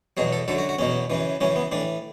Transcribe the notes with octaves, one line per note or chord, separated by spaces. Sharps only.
E2 B2 F#3 G#4
A4
F#2 D3 F#3 A4
F#4
F#4
E2 B2 F#3 C#4
F#2 C#3 E3
F#2 C#3 E3 C#4
B3
A2 E3 D4